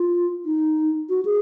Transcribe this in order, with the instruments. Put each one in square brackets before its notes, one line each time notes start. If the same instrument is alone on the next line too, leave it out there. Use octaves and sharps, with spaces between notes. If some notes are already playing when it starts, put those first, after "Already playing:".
Already playing: [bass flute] F4
D#4
F#4
G#4